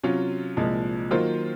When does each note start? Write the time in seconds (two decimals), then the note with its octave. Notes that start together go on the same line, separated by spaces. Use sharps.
0.03 C3 F#3 C#4 F4
0.57 C2 A#2 F3 G#3
1.11 D#3 F#3 A#3 F4 C5